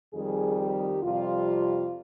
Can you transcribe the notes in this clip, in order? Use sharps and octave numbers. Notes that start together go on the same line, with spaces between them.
F2 D#3 G3 G#4
G4
F2 C3 G3 F4